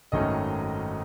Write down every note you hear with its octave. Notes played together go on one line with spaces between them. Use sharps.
G#1 F#2 D#3 A3 C#4 D#5